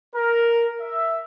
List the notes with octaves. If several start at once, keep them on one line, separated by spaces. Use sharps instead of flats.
A#4
E5